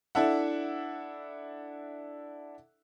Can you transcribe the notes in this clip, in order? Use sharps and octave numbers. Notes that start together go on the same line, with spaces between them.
D4 E4 A4 E5 F#5